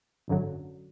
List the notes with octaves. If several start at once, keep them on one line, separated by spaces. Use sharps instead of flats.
G#1 F#2 D3 F#3